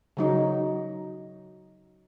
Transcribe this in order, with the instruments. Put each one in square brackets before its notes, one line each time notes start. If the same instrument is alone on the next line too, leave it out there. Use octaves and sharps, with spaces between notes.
[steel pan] C#3 F#3 D#4